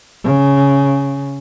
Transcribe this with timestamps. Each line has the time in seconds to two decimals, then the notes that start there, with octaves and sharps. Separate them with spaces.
0.24 C#3